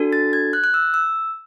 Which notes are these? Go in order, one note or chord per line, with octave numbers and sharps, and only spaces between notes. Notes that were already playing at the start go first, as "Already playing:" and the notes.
Already playing: D4 F#4 A4
A6
G#6
F#6
F#6
E6
E6